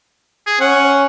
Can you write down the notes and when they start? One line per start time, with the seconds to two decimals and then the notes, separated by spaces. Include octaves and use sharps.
0.46 G#4
0.61 C#4 F#5